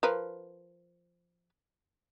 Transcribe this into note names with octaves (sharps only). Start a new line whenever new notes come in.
F3 A#4 B4